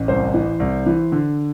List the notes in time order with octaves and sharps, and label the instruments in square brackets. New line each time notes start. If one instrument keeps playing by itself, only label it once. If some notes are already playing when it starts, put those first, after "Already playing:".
Already playing: [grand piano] A1
C2 C5
E3
C2
E3
D3